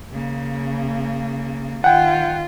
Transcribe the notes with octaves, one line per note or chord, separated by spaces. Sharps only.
C#3 A#3
D#3 F4 F#5 G5